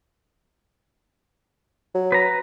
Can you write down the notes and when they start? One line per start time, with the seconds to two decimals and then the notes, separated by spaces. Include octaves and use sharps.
1.95 F#3
2.12 B4 A#5